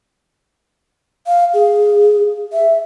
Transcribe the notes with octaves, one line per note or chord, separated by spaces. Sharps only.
F5
G#4
E5